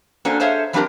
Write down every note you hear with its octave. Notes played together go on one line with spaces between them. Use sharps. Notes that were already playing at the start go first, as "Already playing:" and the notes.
A#3 C#4 D4 F#4 A4 C5
G#4 A4 C5 C#5 E5 F5
F3 G3 C4 D4 G4 A#4